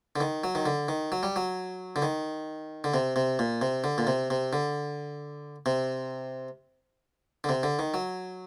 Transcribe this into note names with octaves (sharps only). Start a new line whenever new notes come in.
D3
D#3
F#3
D#3
D3
D#3
F#3
G3
F#3
D3
D#3
D3
C3
C3
A#2
C3
D3
A#2
C3
C3
D3
C3
D3
C3
D3
D#3
F#3